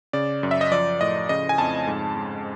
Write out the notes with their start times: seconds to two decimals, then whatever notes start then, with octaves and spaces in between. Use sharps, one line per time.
0.13 C#3 D5
0.43 F#2
0.51 E5
0.61 D#5
0.71 F3 D5
1.01 A2 D#5
1.29 C#3 D#5
1.49 G#5
1.58 F2 A5
1.87 G#2
2.16 G#3